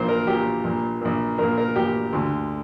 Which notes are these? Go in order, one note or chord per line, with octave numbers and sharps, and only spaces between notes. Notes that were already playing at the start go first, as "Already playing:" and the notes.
Already playing: A#1 A#2 C5
A#4
A#1 A#2 G4
A#1 A#2
A#1 A#2
A#1 A#2 A#4
A#4
A#1 A#2 G4
D2 D3